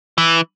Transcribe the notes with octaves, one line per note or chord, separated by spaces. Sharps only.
E3